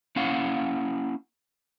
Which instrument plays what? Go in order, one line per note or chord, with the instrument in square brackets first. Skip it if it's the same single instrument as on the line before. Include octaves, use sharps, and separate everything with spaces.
[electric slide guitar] A#3 C#4 E4 F5 F#5